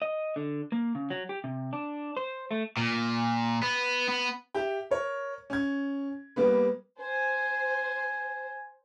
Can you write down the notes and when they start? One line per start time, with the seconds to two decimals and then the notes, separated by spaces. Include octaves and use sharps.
0.02 D#5
0.36 D3
0.72 A#3
0.95 C#3
1.10 F#3
1.29 G4
1.44 C3
1.73 D4
2.17 C5
2.51 A3
2.77 A#2
3.63 B3
4.09 B3
4.54 G4 E5 G5
4.91 A#4 C#5
5.50 C#4 G#6
6.36 G3 A#3 B3 B4
6.99 C5 G#5